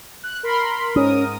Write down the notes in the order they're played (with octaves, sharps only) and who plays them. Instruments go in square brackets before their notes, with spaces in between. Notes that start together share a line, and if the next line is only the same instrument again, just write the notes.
[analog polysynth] F#6
A#4 B5 C6
[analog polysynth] G#2 A#4 D#6 [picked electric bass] C#4